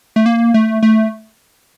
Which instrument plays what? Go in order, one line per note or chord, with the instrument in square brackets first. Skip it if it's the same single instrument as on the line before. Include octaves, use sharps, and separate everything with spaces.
[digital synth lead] A3
A#3
A3
A3